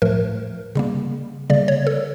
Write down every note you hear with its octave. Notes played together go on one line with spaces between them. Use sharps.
A2 F3 A3 A#4
C#3 G3 A#3
C#3 G3 A#3 D5
C#5
A4